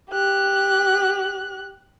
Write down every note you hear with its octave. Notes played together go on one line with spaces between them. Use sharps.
G4 F#6